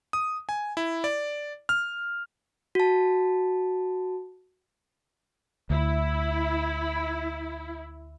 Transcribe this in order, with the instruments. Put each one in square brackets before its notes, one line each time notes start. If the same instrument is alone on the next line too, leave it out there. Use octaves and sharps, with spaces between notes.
[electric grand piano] D#6
G#5
E4
D5
F6
[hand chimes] F#4 A5
[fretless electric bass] D2 [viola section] E4